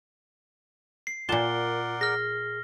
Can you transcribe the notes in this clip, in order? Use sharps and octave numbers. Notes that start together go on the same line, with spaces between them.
C7
A#2 F4 A#4 D5 F#5 A5 G7
G#4 F6 A#6